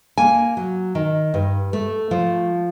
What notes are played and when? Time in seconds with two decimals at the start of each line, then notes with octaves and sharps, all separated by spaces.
0.18 A#3 G#5
0.57 F#3
0.95 D#3
1.34 G2
1.73 A3
2.11 F3